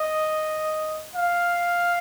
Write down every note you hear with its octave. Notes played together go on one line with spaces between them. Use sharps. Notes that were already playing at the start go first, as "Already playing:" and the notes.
Already playing: D#5
F5